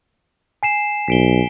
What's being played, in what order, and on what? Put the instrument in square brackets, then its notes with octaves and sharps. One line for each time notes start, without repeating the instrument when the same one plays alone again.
[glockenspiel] G#5 C7 E7
[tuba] B1 [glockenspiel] B6 D7 G7